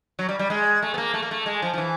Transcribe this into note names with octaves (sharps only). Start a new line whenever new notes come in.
F#3
G3
G3
G#3
A3
B3
A#3
A3
A#3
A3
G#3
F3
F3
E3